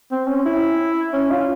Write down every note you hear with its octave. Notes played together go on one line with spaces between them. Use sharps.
C4
C#4
E4
C#4
F4